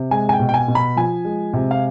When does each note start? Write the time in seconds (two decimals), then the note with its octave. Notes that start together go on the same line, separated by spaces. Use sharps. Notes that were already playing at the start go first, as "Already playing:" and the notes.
Already playing: C3
0.11 G#3 G#5
0.29 G#5
0.33 G5
0.39 B2
0.49 G5
0.54 G#5
0.68 B2
0.75 B5
0.97 F3 G#5
1.25 G#3
1.54 C3
1.71 F5